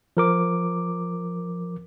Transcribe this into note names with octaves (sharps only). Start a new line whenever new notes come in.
F3 A#4 D6